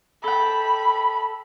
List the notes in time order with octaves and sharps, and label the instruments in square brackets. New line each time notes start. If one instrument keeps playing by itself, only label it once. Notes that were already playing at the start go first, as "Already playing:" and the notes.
[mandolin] A4 G5 [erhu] B5